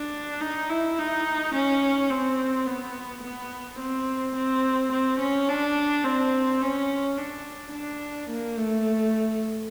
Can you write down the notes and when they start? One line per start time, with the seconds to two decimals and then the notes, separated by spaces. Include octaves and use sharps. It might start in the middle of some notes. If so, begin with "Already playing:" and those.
Already playing: D4
0.41 D#4
0.69 E4
0.98 D#4
1.54 C#4
2.10 C4
2.67 B3
3.23 B3
3.79 C4
4.35 C4
4.92 C4
5.19 C#4
5.48 D4
6.04 C4
6.61 C#4
7.18 D4
7.73 D4
8.30 A#3
8.58 A3